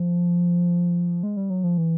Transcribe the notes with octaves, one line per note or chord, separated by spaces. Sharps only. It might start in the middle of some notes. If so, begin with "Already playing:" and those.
Already playing: F3
G#3
G3
F#3
F3
E3